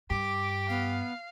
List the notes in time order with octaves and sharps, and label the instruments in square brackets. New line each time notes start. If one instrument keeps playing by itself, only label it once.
[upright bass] G2 [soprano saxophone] G4 [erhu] D6
[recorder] B3 [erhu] F5